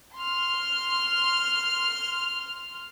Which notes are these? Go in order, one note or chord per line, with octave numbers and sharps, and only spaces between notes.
C6 F6